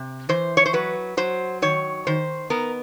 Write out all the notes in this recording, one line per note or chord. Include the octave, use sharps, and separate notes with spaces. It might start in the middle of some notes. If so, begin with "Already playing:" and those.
Already playing: C3
E3 C5
C#5
C5
F#3 B4
F#3 C5
D#3 C#5
D#3 C5
B3 A#4